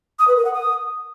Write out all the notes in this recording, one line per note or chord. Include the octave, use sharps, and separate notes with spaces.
D#6
B4
A#4
F#5
D#6